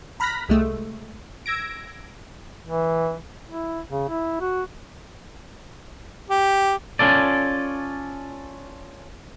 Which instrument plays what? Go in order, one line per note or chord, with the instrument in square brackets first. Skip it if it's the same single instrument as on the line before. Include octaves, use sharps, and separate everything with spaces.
[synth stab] A#5 B5 F6 F#6 A#6 B6
C2 G#3 A3
E6 G#6 A#6 D7
[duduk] E3
E4
C#3
E4
F#4
[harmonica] G4
[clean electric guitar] C#4 F4 A4 D5